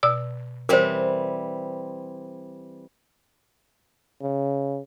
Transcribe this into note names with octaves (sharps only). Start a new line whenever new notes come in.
B2 D5 E6
E3 G3 C4 A#4 C5
C#3